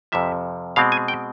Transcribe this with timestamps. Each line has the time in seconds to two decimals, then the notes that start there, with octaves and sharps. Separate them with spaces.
0.12 F2 C3 F3 E5
0.76 B2 G#3 C4 F5
0.92 G#5
1.08 G5